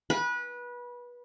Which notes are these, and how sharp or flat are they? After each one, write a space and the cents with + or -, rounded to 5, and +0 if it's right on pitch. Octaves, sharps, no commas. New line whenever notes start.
B4 -25